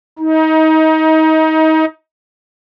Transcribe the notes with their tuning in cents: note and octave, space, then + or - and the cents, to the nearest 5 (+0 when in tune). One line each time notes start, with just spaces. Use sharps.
D#4 +25